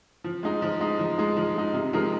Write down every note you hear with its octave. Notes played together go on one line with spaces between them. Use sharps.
F3
G#3 D#4
F3
G#3 D#4
F3
G#3 D#4
F3
G#3 D#4
C3
F3 G#3 D#4 A#4